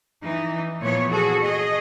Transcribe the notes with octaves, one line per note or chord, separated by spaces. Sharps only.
E3 D#4
A#2 E3 F3 B3 C#5
F#4 G#4 A4
G#4 D#5